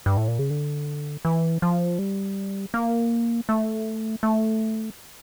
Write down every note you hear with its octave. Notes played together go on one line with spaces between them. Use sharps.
G2
A2
A#2
C#3
D3
E3
F3
G3
A#3
A3
A3